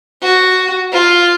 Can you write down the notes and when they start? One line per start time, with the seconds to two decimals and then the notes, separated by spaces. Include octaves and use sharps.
0.23 F#4
0.93 F4